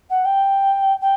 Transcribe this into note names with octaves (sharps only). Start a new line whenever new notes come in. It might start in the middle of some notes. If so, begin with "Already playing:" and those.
F#5
G5
G5